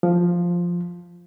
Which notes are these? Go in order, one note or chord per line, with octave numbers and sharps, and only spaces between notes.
F3